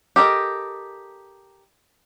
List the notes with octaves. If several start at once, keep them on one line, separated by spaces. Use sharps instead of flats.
G4 A4 A#4 D#5